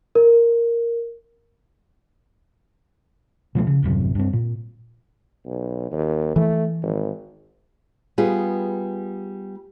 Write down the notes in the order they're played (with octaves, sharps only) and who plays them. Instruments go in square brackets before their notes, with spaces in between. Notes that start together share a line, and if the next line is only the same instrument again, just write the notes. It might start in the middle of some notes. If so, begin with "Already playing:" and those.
[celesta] A#4
[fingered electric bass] B2 F3 F#3 A3
C#3
D#1 A1 F#2 C3
G2 C4
A#2
[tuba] B1
D#2
[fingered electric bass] E3 [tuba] A3
[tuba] G#1
[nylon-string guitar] G3 B3 F4 G#4